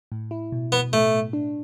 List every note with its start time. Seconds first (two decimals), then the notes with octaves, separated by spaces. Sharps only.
0.12 A2
0.31 E4
0.52 B2
0.72 B2 B3
0.92 A2 A3
1.13 A2
1.33 D4